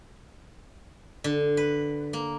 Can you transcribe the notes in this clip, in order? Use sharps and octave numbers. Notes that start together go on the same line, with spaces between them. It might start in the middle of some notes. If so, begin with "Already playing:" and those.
D3
B4
A#3